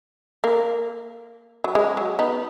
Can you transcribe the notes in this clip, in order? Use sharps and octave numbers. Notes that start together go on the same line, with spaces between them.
A#3
F#3
G#3
F#3
B3 D#4